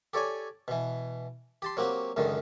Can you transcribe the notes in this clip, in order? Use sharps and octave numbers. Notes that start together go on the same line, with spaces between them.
G4 A4 C#5 D5 G#5
B2 E3
G4 A5 C6
F#3 A#3 C4 F#4 G4
C#2 F#2 D3 D#3